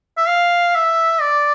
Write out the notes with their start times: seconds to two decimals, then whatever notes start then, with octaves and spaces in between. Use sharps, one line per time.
0.17 E5
0.28 F5
0.75 E5
1.21 D5